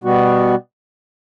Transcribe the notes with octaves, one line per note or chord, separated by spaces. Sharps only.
B2 G3 B3 F#4